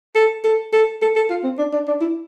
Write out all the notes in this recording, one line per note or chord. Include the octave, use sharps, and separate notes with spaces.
A4
A4
A4
A4
A4
F4
C4
D4
D4
D4
E4